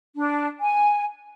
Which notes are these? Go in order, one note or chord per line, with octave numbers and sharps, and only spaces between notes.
D4
G#5